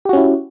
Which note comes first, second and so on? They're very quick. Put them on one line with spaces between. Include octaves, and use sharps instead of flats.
G4 F#4 C#4 E4